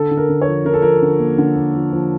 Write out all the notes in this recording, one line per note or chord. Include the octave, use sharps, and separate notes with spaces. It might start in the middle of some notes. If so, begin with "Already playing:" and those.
Already playing: D3 A4
D3
A#4
D3
C#5
F3
D3 A#4
A4
F3 A#4
D3
A#3
D3
A#3
F3
F3